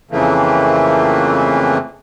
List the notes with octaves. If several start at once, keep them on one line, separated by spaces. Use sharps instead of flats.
F2 C#3 E3 A3 A#3